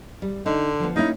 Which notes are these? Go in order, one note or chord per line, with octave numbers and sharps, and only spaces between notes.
G3
D3 D#4
F3 B3
A#3 C#4 D#4 E4